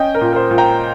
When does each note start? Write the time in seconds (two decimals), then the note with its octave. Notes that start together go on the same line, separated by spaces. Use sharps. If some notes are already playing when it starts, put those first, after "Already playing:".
Already playing: C#4 D#5 G5
0.15 A#4
0.21 A#2
0.33 A#4
0.36 C5
0.51 A#2
0.58 G5 A#5